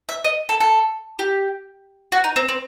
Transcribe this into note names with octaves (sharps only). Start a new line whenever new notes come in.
E5
D#5
A4
A4
G4
F#4
D#4
C4
C4